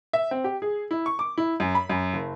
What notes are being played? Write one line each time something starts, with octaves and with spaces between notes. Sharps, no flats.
E5
C4
G4
G#4
E4
C#6
D6
E4
F#2
B5
F#2
F#1